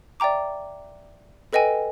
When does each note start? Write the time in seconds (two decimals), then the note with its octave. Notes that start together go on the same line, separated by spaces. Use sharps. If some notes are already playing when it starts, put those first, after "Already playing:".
0.20 D5 E5 G5 A#5 D6
1.53 A4 B4 D#5 G5 G#5